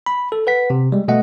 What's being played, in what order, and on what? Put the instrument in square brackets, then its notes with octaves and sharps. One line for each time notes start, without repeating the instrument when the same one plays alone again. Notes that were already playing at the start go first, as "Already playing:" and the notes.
[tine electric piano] B5
A4
B4 F#5 B6
C3
G3 G#3
B2 A3 D#5 F#5